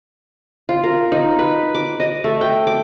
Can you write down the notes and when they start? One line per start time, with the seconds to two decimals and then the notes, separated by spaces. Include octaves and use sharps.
0.69 F4
0.84 A#4
1.12 D#4
1.39 B4
1.75 D6
2.00 D#5
2.24 A3
2.41 G5
2.67 D6